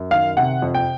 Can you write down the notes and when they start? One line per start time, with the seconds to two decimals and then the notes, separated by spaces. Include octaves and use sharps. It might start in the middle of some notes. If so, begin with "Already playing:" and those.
Already playing: F#2
0.11 D#3 F5
0.37 C3 F#5
0.62 F2
0.75 G5